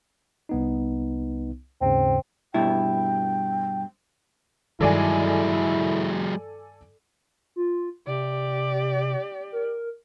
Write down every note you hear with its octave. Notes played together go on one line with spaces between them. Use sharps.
C2 B3 D#4
D#2 G#2 C#3 C4
G2 B2 E4 G5
G2 D#3 F#3 G#3 E4 A4 D5 G#5
F4
C3 G4 D5
A#4